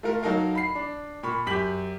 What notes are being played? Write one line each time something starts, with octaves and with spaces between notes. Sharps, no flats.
A3 F4 A#4
F#3 D#4 A4 A#4 F5
B5 C7
D4
A#2 B5 C#6
F#2 G4 B6 F#7